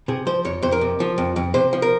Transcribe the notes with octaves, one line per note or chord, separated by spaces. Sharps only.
C3 G#4
F3 C5
F2 C#5
F2 C5
A#4
C3
F3
F2
F2
C3 C5
F3
A#4